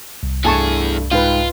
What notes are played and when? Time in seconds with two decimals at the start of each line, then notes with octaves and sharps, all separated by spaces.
0.23 C2
0.44 G2 E3 A3 G#4 G#5 A5 C#6
1.12 G#2 F4 B4 F5 G5